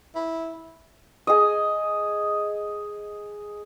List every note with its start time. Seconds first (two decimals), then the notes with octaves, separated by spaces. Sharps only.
0.15 E4
1.27 G#4 D#5